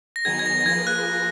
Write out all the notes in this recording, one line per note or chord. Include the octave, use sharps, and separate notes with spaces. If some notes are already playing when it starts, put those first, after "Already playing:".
A#6
D#3 F#3 B3 D#4 G#4 G#6
G#6
A#6
A#6
F3 A#3 F4 G#4 B4 G#6
F#6